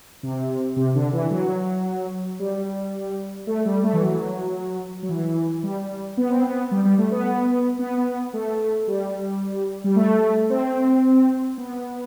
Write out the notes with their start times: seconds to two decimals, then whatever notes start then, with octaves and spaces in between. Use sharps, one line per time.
0.23 C3
0.76 C3
0.95 D3
1.13 E3
1.31 F#3
2.39 G3
3.47 A3
3.65 G3
3.83 A3
3.93 E3
4.01 F#3
5.03 F#3
5.09 E3
5.63 G3
6.17 B3
6.29 C4
6.42 B3
6.71 G3
6.85 G3
6.98 A3
7.11 B3
7.79 B3
8.33 A3
8.88 G3
9.84 G3
9.96 A3
10.50 C4
11.58 B3